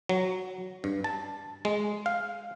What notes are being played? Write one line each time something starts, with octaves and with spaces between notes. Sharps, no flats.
F#3
G2
A5
G#3
F5